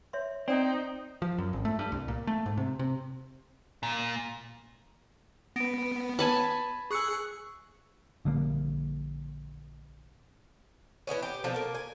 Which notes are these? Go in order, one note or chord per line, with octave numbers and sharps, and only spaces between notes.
C#5 E5 C6
C4 D#4 D5 G5
F3
F#2
G#1
A3
G2
C2
A#2
A3
G#2
C3
C3
A#2
B3 A#6 D7
B4 G#5 A5 B5
G#4 C#6 E6 F#6 C#7
A#1 D3 G3 A#3
E3 G#3 B3 C#4
G4
B2 D3 F3
A#3
G#5